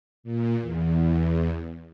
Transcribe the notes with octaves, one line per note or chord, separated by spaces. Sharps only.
A#2
E2